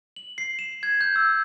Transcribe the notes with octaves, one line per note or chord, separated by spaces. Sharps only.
F#7
C7
E7
G#6
G6
E6